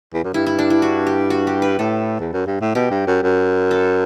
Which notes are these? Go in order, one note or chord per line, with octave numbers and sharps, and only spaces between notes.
E2
F#2
G2 E4
E4
D4
E4
F#4
G4
F#4
G4
B4
A2 A4
E2
F#2
G2
A2
B2 G4
G2
F#2
F#2
A4